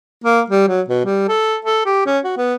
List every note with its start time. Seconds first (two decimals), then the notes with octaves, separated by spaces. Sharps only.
0.24 A#3
0.50 G3
0.68 F#3
0.89 B2
1.06 G3
1.28 A4
1.65 A4
1.86 G4
2.06 C#4
2.24 F#4
2.38 B3